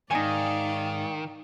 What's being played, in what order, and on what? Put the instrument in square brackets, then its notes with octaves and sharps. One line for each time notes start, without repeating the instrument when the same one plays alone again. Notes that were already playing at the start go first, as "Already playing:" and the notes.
[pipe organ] G#2 [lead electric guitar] D#3 [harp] D#4 G#5 [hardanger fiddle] D5 F5